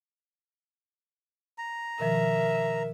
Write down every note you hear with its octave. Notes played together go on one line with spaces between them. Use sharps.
A#5
B2 D#3 F3 A#4 E5